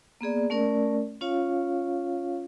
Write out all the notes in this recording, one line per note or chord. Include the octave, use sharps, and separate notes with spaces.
A#3 B3 G#4 D5
A3 C#4 A#4 D5
C#4 F4 C#5 F5